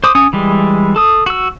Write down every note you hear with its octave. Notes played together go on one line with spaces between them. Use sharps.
C5 D6 D#6
C#4 D#6
E3 G3 G#3
A4 D#6
F#4 E6